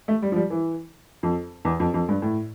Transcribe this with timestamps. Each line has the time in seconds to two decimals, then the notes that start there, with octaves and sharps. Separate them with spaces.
0.08 A3
0.22 G3
0.32 F3
0.36 G3
0.50 E3
1.23 F2
1.65 E2
1.80 F2
1.94 F2
2.09 G2
2.22 A2